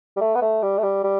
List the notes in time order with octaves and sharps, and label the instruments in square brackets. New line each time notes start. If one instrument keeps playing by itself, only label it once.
[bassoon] G3
A3
B3
A3
G3
A3
G3
G3